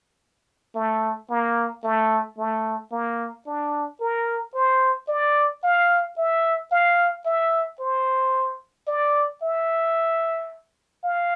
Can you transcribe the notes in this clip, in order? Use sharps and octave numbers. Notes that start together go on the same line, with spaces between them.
A3
A#3
A3
A3
A#3
D4
A#4
C5
D5
F5
E5
F5
E5
C5
D5
E5
F5